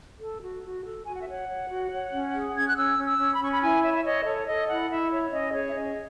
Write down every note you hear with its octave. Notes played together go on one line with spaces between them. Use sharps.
A4
F#4
F#4
A4
F#4 G#5
F#5
E5
C#5 F#5
C#5
F#4
C#5
C#4
G#4
C#4 G#6
F#6
C#4 E6
C#4
E6
C#4
B5
C#4 C#6
B5
E4 G#5
C#5 E5
E5
C#5 D#5
A4 C#5
A4 D#5
E4 F#5
E4 E5
C#5
C#4 D#5
G#4 C#5
E5
C#4 D#5